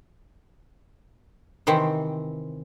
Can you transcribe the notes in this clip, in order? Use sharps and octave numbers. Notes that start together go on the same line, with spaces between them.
C3 D#3 E3 C4